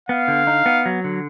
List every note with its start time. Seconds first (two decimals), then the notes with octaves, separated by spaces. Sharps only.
0.09 B3 F5
0.28 D3
0.47 D#4
0.66 B3
0.86 F#3
1.04 D3